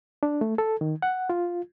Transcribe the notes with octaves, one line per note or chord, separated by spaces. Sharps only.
D4
A3
A4
D#3
F#5
F4